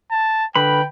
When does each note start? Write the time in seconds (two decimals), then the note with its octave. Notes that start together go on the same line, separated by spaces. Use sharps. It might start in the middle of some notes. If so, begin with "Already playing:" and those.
0.11 A5
0.56 D3 B4 G5 B5